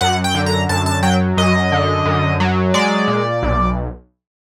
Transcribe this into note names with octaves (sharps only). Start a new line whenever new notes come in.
F#2 F#5
G5
D3
A#5
F#2 A5
A5
F#3 G5
F#2 D#5
D3
F#2
F#3
G#3 D5
A#2
B1